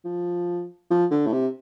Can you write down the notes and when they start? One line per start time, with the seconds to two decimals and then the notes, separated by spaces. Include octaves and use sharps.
0.05 F3
0.91 F3
1.11 D3
1.26 A2
1.32 C3